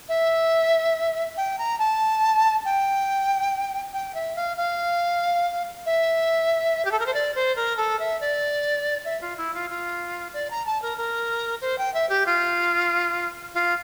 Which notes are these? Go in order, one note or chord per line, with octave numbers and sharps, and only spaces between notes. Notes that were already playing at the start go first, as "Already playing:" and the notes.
E5
G5
A#5
A5
G5
G5
E5
F5
F5
E5
G4
A4
A#4
C5
D5
C5
A#4
A4
E5
D5
E5
F4
E4
F4
F4
D5
A#5
A5
A#4
A#4
C5
G5
E5
G4
F4
F4